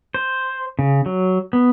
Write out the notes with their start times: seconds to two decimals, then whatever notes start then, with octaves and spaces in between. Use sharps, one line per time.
0.14 C5
0.79 C#3
1.06 F#3
1.53 B3